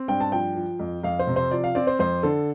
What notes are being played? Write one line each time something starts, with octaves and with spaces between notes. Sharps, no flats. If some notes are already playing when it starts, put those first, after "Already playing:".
Already playing: C4
G2 G5
A5
F3 G5
F3
F2
F2 F5
C5
C3
C5
F3 D5
F5
C4 D5
C5
F2 C5
D3 A4